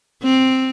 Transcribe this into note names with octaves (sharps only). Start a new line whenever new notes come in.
C4